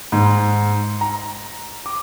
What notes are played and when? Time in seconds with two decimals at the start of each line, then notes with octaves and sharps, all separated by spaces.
0.12 G#2
1.01 A#5
1.86 D6